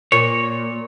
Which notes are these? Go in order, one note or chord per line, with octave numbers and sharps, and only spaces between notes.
A#2 C#5